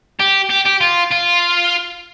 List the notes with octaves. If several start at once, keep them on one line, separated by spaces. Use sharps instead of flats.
G4
G4
G4
F4
F4